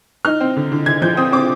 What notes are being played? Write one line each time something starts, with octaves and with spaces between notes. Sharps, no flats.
D#4 F6
C4
D3
D3
D3 G#6
F3 G6
C4 D#6
C4 D6